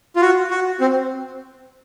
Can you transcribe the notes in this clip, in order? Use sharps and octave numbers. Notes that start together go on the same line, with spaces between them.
F4
F#4
F#4
C4